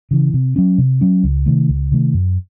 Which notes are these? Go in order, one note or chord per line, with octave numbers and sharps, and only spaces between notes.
C#3 E3
C3
F#3 C#4
C3
F#3 C#4
C#2
C3 D#3 A3
C#2
C3 D#3 A3
F#2